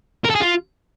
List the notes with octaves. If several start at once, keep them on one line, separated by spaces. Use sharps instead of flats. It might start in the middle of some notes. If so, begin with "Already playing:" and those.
A#4
A4
G#4
F4